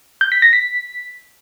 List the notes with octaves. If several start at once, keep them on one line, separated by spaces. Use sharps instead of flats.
G6
B6
A#6
B6